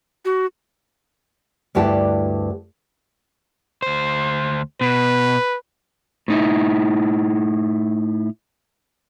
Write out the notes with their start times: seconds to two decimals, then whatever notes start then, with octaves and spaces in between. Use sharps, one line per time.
0.25 F#4
1.75 D2 G2 E4 G4 A5
3.82 D2 C5
4.81 B2 B4
6.28 A2 D#4 E4